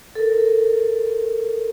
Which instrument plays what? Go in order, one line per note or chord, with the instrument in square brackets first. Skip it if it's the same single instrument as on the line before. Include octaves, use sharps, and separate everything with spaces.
[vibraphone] A4 A#4